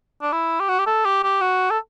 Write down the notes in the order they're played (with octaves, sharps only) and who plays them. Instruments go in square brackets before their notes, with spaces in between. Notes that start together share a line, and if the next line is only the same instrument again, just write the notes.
[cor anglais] D4
E4
G4
F#4
G4
A4
G4
G4
F#4
A4